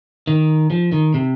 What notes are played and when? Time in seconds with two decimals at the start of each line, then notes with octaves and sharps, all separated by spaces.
0.27 D#3
0.70 F3
0.92 D#3
1.14 C3